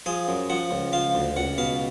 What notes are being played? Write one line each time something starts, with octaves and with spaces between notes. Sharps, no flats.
F3 G#4
F#2
F3 F#5
C#2
F3 F5
D2
C#2 F#5
B2 F5